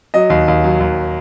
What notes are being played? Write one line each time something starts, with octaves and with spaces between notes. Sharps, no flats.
F#3 D#5
D#2
D#2
F#3
D#2